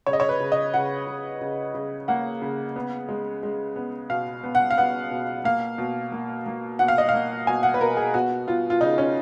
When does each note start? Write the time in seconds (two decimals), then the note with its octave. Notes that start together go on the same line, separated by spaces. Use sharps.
0.07 C#3 C#5
0.13 D#5
0.20 C#5
0.29 B4
0.40 C#3
0.52 D#5
0.74 C#3 F#5
1.07 C#3
1.41 C#3
1.74 C#3
2.08 A#3 F#5
2.42 C#3
2.76 B3
3.09 G#3
3.43 G#3
3.76 B3
4.10 B2 F5
4.43 B3
4.55 F#5
4.71 F5
4.78 B3 F#5
5.11 B2
5.44 A#3 F5
5.78 B2
6.12 A#3
6.46 A#3
6.79 B2 F#5
6.88 F5
6.98 D#5
7.09 F5
7.14 A#3
7.47 B2 G#5
7.63 F#5
7.74 B4
7.81 B2 A#4
7.97 G#4
8.14 B3 F#4
8.47 B3 F4
8.70 F4
8.81 C#3 D#4
8.98 C#4